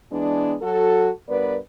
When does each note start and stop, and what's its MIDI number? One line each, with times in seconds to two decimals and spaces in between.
0.12 0.55 52
0.12 0.55 56
0.12 0.55 59
0.12 0.55 62
0.62 1.10 54
0.62 1.10 66
0.62 1.10 69
1.29 1.57 43
1.29 1.57 59
1.29 1.57 70
1.29 1.57 71
1.29 1.57 74